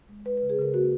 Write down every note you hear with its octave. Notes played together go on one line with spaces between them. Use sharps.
G#3
G#3 B4
B4
C#3
G#4
C#3 A#4
A#3 F#4